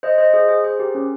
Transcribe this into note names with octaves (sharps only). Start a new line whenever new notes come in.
C5 D#5
C5 D#5
G#4 C5
G#4 C5
G#4 C5
G4 A#4
C#4